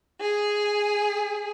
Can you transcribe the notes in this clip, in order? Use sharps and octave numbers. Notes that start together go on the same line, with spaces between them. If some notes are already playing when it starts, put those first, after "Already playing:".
G#4